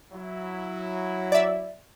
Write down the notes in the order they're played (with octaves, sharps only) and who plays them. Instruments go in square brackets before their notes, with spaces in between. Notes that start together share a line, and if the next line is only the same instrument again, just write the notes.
[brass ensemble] F#3 E4
[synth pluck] D5 E5